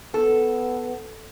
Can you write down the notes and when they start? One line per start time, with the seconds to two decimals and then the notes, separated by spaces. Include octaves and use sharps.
0.14 B3 A4